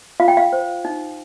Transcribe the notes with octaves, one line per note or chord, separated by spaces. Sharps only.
F4 F5
G5
F5
C5
D#4